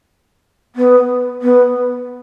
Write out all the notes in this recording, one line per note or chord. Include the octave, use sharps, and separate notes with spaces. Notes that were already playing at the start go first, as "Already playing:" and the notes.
B3
B3